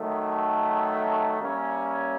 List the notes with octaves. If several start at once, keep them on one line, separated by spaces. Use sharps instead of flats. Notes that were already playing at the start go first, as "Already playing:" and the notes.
Already playing: D#3 F#3 A3
G3 A#3 C#4 E4